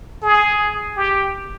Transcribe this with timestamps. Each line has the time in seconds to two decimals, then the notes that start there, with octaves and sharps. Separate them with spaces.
0.22 G#4
0.97 G4